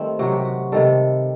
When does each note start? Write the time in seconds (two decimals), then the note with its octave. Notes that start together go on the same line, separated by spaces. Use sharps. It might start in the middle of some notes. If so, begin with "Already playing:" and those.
Already playing: D#3 G3 A3 C4
0.19 C3 F#3 F#4
0.32 G4
0.44 F#4
0.72 C3 D#3 G3 A4